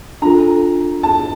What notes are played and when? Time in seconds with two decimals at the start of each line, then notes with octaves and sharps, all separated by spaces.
0.22 D4 F4 A4 A#5
1.03 A5